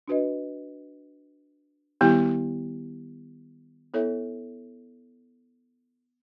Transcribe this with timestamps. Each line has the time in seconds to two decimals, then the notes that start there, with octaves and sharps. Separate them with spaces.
0.08 D4 F#4 B4 D#5
2.01 D#3 G3 B3 E4 G4
3.94 B3 E4 A4 C#5 E5